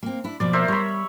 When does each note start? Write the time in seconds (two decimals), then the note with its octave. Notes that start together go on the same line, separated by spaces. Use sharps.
0.03 A#3 C4
0.24 D4 E4
0.40 B2 F3 A#3 D5
0.53 A#4 C5 E5
0.68 G3 C#5 B5